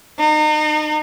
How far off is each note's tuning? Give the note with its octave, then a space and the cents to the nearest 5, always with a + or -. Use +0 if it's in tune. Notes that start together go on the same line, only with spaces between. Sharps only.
D#4 -35